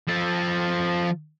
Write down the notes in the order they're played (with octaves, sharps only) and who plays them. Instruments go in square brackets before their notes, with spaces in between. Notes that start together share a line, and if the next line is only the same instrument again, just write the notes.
[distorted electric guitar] F3 A4